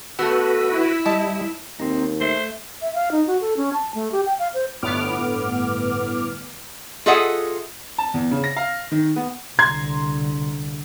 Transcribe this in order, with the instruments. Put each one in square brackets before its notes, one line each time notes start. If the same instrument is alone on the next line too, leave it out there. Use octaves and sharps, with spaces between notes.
[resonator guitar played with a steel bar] A3 B3 [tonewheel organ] F#4 B4 [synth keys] A4 E6
[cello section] E4
[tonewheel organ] G3 [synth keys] D#5 [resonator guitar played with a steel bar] A5
[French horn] D#2 [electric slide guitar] C4 D#4
[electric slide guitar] A3 E5 [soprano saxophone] C5
[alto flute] E5
F5
D#4
F#4
A4
C#4
A5
A3
G4
G5
F5
C5
[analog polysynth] G1 A2 B3 D6 F6
[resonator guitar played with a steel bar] F4 G#4 A4 D#5 E5 F#5
[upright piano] A5
E2
C#3
A#6
F5
D#3
B3
[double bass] C2 D3 [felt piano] A#5 C6 G#6